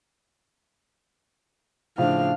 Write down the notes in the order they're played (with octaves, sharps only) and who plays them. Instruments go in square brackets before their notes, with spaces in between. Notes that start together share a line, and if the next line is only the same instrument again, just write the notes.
[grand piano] A2 C#3 F3 [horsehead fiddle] D4 F5